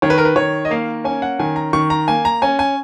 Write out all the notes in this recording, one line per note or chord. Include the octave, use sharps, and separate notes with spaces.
D#3 C#5
B4
A#4
B4
D#3 C#5
D#5
A#3 F5
C#4 G#5
F#5
D#3 G#5
A#5
D#3 C#6
A#5
A#3 G#5
A#5
C#4 G#5
G#5